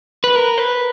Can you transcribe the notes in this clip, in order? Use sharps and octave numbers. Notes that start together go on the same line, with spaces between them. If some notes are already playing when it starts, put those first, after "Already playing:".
B4
A#4
B4